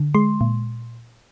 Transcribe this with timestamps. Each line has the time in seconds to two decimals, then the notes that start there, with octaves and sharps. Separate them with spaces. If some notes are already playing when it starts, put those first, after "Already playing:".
Already playing: D3
0.14 G#3 C6
0.41 A#2